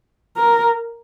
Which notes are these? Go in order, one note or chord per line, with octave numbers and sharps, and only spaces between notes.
A#4